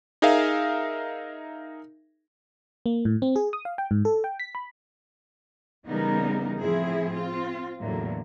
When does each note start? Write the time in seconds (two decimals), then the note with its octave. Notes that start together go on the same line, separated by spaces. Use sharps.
0.22 D#4 G#4 A#4 E5 F5
2.86 A#3
3.05 A2
3.22 C4
3.36 G#4
3.53 D#6
3.65 F5
3.78 G5
3.91 G#2
4.05 A4
4.24 G5
4.40 B6
4.55 B5
5.85 C#3 E3 G3 B3 D#4 A#4
6.58 A2 F3 C4 E4 G#4
7.11 C4 F4
7.79 E2 A2 D3 F#3 A#3